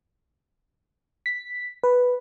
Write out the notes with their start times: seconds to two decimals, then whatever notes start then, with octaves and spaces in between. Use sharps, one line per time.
1.26 B6
1.83 B4